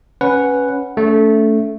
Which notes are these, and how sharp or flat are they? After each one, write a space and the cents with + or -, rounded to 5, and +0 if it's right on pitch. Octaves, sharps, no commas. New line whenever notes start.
C#4 +0 B4 +0 F#5 +0
A3 +0 C#4 +35